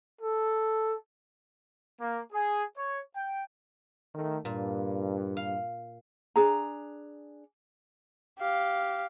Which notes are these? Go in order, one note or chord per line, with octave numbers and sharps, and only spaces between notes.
A4
A#3
G#4
C#5
G5
D#3 A3
G2 A#2
F5
D4 G#4 A#5
G4 F5